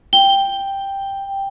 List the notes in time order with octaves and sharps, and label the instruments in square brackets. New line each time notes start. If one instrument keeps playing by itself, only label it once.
[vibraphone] G5 [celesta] G7